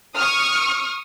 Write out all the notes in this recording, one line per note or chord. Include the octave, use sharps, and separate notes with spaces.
C#6 D#6 F6